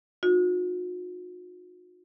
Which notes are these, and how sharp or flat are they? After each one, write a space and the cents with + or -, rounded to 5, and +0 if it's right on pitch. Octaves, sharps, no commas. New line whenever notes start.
D#4 -10 F#4 -45